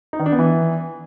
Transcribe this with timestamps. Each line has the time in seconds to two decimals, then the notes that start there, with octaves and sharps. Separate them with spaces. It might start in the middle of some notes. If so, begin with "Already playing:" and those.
0.13 D#4
0.19 D#3
0.26 D4
0.32 B3
0.39 E3